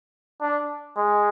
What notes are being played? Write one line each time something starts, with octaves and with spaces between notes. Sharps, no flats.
D4
G#3